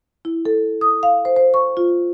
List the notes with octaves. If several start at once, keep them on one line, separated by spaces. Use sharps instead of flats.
E4
A4
D#6
F5
C5
C5
C#6
F4